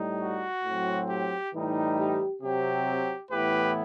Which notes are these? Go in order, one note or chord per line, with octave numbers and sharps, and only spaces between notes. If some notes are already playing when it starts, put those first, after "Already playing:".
Already playing: A2 G3 D#4
F#4
A2 F#3 C4
G4
A2 E3 G3 D#4
G4
C3 F#3 C4 G4
A2 E3 B3 E4 G4 B4